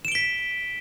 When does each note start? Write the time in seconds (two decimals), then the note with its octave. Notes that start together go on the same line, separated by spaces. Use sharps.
0.05 E7
0.08 D7
0.12 G7
0.15 B6